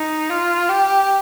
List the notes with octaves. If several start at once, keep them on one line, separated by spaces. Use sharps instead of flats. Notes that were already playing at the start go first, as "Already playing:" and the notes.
Already playing: D#4
F4
G4